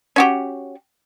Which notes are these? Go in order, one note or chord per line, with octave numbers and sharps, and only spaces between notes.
C#4 F#4 G4